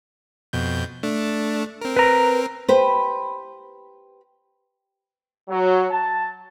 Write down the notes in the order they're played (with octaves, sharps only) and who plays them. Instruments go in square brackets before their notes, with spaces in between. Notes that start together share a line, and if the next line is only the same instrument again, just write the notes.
[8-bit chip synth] F2 B2 G6
A3 D4
C4 A#4
[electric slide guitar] B4 A#5
[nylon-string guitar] G4 B4 C5
[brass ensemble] F#3
A5